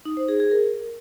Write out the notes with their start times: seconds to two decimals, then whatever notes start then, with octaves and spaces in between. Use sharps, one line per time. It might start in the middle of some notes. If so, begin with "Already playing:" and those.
0.05 D#4
0.17 C5
0.28 G#4
0.40 G#4
0.51 A#4